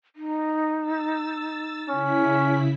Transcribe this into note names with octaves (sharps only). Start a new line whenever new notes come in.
D#4
E6 A6
C#3 C#4 E4 B6